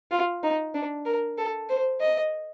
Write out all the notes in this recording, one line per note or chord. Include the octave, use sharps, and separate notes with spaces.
F4
D#4
D4
A#4
A4
C5
D#5